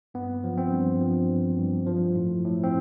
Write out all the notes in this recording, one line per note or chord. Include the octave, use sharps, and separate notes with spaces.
G2 B3
F3
C4
G2
F3
G2
G2
F3
A2
A2
C4